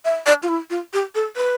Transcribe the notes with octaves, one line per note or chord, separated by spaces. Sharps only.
E5
D5
F4
E4
F4
G4
A4
B4